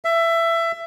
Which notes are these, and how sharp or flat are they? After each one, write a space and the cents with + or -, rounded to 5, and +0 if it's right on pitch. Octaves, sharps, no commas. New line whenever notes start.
E5 +20